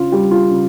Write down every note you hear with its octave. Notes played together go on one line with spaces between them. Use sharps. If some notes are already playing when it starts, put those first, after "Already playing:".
Already playing: C#3 F4
G3 G4
F4
C#3